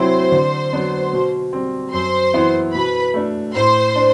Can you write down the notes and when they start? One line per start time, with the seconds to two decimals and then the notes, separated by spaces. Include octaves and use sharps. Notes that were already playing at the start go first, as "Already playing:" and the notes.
Already playing: C3 F#3 C4 E4 C5 C6
0.32 D3
0.73 F#3 B3 D4
1.13 B2
1.53 G3 C4
1.93 F#2 C5 C6
2.34 E3 B3 E4
2.74 B2 B4 B5
3.14 A3 D4
3.55 A2 C5 C6
3.96 D4